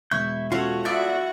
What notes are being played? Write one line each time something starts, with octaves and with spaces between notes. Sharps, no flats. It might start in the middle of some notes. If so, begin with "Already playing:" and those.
E1 E4 C#6 G6
C#4 F4 F#4 A4 C#5
B3 E4 F#4 D5 E5 A6